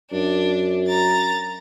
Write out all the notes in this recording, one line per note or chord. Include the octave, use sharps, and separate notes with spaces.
F#2 D4
A#5 A6